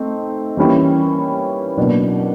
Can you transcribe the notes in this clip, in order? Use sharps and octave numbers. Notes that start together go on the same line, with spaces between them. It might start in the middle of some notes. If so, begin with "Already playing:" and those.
Already playing: A3 C4 D#4
E3 G3 A#3 C#4 E4
B2 F#3 A#3 D4